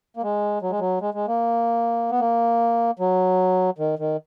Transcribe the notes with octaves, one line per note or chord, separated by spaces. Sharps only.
A#3
G#3
F#3
G#3
F#3
G#3
G#3
A#3
B3
A#3
F#3
D#3
D#3